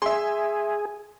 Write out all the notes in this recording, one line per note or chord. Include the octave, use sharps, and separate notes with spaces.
G#4 E5 C6